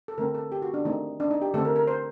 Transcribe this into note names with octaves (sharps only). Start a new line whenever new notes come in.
A4
D3 A3 C4 A#4
A4
G4
F#4
D4
D#3 A3 C4 D#4
D4
D#4
G4
D3 A3 C4 A4
A#4
A#4
C5